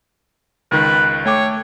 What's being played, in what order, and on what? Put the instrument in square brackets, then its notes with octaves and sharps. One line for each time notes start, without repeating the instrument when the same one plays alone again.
[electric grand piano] C#2 D#3 [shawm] B4
[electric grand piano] A3 G5 D6 [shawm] C#5